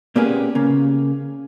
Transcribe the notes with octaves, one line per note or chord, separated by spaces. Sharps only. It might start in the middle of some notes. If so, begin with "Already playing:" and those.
A#2 A#3 B3 C#4 G4 G#4
C#3 A#3